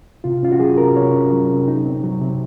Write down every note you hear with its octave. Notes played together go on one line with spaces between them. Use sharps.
C3 F4
C#4 F4
F#4
F#3 G#4
C3 A#4
C3 C#5
C#4
F#3
C3
D#4
C4
F#3
C3